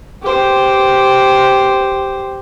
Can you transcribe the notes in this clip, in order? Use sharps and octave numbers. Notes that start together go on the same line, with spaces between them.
G4 C5